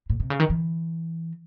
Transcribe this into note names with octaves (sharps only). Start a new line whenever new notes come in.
A2
C3
C#3
D#3
E3